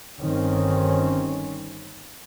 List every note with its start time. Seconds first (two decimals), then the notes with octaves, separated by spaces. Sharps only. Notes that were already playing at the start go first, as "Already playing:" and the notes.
0.20 G1 G2 D#3 C4 C#4